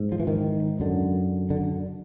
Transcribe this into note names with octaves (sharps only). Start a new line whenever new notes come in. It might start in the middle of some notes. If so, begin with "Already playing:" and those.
Already playing: G#2
F3
E3
D#3
F#2 D3
D3